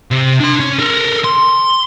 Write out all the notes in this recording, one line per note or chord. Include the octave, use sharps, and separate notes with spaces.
C3
D4 C6
C#4
A4 A#4
C6